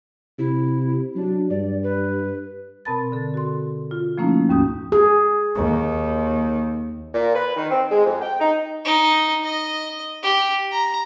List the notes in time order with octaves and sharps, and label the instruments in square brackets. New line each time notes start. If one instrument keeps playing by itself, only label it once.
[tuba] C3 [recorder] E4
[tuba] F#3 [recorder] D4
[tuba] G2 [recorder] D5
[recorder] B4
[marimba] B2 C4 A#4 A5 B5 A6
D3 A4
F#4 C6
F4
F3 A3 A#3 C#4 D#4 E4
D#2 G#2 C#4 F#4 D#6 G6
[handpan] G#4
[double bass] D#2
[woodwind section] A#2
B4
D#3
C4
G#3
F2
G5
D#4
[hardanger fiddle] D#4
D#5
G4
A#5